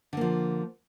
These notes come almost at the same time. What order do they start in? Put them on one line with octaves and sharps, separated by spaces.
D3 A#3 F3